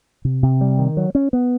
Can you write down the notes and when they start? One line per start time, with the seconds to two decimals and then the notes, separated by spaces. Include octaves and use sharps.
0.25 C3
0.43 C3
0.61 G3
0.79 D#3
0.97 F#3
1.15 C#4
1.33 B3